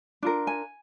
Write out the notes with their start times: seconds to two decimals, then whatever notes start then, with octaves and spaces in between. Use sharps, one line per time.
0.23 D4 F4 A#4
0.47 G#5